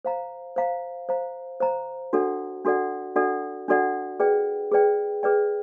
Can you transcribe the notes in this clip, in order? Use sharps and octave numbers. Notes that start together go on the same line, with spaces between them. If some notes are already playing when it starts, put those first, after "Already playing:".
C5 F5 A#5
C5 F5 A#5
C5 F5 A#5
C5 F5 A#5
D4 F#4 A4 D5 F#5
D4 F#4 A4 D5 F#5
D4 F#4 A4 D5 F#5
D4 F#4 A4 D5 F#5
G#4 B4 D5 G5
G#4 B4 D5 G5
G#4 B4 D5 G5